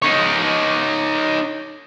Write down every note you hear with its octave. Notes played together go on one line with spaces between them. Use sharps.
D#4 C#5